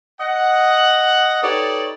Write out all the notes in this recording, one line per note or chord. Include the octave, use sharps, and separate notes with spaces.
D#5 F#5
D#4 G4 A4 B4 C#5 D5